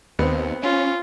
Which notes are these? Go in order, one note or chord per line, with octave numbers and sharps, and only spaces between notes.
D#2 B3 C4
C#4 F4